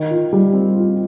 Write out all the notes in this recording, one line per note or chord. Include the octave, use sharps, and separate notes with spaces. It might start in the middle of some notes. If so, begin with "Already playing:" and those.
Already playing: D#3
F4
G3
C4
F4